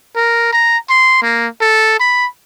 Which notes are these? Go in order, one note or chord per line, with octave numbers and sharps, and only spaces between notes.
A#4
A#5
C6
A#3
A4
B5